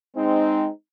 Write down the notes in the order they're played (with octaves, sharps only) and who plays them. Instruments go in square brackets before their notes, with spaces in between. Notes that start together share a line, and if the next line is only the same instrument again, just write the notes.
[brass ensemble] G#3 C4 D#4